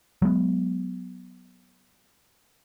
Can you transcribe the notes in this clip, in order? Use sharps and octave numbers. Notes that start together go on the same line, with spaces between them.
F#3 G#3 B3